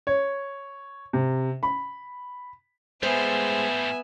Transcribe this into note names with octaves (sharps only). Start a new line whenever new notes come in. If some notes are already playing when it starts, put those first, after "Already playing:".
C#5
C3
B5
A2 G3 G#3 B3 C5 E5 G#5